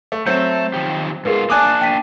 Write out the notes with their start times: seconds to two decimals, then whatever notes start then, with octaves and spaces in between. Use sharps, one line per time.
0.12 A3
0.27 F#3 A3 C4 E5 G6
0.74 D#3 F3 G4
1.25 G#2 F4 G#4 A#4 B4
1.50 A#3 D4 D5 G#5 A5 D6 D#6 F#6
1.81 G5 B6 D#7